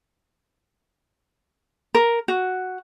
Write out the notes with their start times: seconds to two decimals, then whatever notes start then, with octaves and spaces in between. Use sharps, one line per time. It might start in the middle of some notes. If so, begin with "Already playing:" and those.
1.94 A#4
2.28 F#4